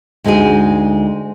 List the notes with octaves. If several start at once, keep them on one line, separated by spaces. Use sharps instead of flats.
D2 G#3 D#4 F#4 G#4